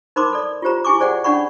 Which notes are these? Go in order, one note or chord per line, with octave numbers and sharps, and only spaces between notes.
D#4 A#4 C5 B5 C6 D6
A4 D5
F4 G4 C5 A#5
E4 G4 G#5 C#6 D6
G#4 C5 D5 F#5 G5
C#4 D4 D5 F#5 B5 C#6